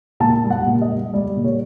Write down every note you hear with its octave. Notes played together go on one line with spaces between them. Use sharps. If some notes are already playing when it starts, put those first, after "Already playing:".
A#2 A5
G3
F#5
A#2
D#5
G3
G3 D5
A#2
C#5